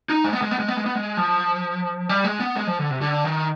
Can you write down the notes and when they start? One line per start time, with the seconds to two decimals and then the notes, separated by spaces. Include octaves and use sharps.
0.10 D#4
0.24 G#3
0.33 B3
0.42 G#3
0.51 B3
0.60 G#3
0.68 B3
0.77 G#3
0.86 B3
0.95 G#3
1.17 F3
2.09 G3
2.24 G#3
2.40 B3
2.55 G#3
2.67 F3
2.79 D3
2.91 C3
3.01 D3
3.24 D#3